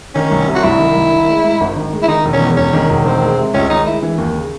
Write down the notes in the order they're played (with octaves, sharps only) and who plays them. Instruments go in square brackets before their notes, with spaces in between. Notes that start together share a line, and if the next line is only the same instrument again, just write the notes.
[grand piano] D#3 [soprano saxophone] C#4
[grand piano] C2
C3
[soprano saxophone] F#4
[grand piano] C2 [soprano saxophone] E4
[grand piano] D#3
C2
D#3
G#3
G#2
G#1
D#3
G#3
[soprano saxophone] E4
[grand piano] D#3 [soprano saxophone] D#4
[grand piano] E1
[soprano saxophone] C#4
[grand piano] E2
[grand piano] E1 [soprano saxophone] C#4
[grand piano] D#3
E1
[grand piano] D#3 [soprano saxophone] C4
[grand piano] G#3
C3
[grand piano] C#2 [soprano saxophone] C#4
[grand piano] D#3 [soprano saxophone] D#4
[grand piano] G#3 [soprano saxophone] E4
[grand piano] E3
D#2
C#3